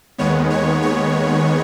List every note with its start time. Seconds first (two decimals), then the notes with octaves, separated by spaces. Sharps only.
0.18 D#2 D#3 G#3 B3 C#5
0.50 C#5
0.83 C#5